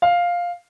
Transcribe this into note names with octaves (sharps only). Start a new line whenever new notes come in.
F5